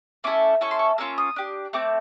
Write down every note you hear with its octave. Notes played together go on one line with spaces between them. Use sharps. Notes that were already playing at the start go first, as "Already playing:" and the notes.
A3 C#4 E4 A4 D6
C#4 E4 A4 C#6
C6
C#6
A#3 C#4 F4 E6
D#6
D4 G4
A3 C4 D6